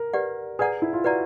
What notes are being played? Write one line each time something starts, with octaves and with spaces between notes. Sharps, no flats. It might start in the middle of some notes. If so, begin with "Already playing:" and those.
Already playing: A#4
G4 B4 D5 F#5
G#4 B4 D5 F#5 A#5
E4
F4
F#4 B4 D5 F#5 A#5